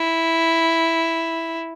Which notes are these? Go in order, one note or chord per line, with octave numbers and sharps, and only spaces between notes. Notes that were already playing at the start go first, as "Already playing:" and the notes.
Already playing: E4